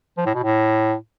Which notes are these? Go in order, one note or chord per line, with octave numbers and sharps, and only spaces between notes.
F3
A2
B2
A2